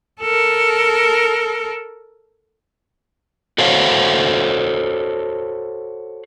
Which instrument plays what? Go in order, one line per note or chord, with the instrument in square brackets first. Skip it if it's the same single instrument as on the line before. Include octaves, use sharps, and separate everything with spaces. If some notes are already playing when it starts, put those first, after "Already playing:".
[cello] A4 A#4
[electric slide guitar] F#4 A4 C5 C#5 F5 F#5